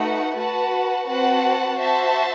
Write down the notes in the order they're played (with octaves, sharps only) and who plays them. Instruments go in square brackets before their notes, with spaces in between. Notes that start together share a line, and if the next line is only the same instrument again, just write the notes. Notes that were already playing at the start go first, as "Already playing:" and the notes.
Already playing: [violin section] A3 D#4 F#4 B4 F#5
F#4 B4 F#5 A5
C4 F#4 B4 F#5 A5
F#4 C5 E5 A5